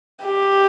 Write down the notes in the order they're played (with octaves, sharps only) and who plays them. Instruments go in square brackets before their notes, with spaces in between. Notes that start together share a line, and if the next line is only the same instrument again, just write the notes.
[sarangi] G4